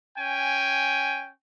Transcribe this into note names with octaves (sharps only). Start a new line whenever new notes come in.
C#4 G5 G#5